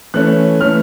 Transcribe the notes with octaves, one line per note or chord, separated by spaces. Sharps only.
E3 A3 C#4 F#6
E3 A3 C#4 F6